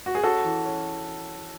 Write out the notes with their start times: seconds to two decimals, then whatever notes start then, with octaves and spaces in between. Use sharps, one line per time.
0.06 F#4
0.15 G#4
0.23 C#4 F#4 A4
0.44 E3
0.64 C#4